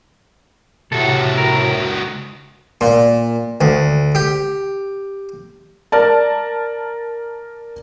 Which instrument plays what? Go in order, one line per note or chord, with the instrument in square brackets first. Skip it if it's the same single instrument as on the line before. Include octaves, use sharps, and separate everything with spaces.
[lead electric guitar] C#2 F#4 [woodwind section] A2 C3 [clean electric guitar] A4
[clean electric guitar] A#4
[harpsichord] A#2
D2
G4
[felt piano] A#4 D5 A5